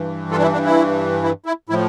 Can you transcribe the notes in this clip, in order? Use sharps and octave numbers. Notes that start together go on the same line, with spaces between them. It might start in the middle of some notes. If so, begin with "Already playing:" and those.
Already playing: G2 E3
F4 A4
D4
E4
D4
E4
E4
E4
A2 F3 E4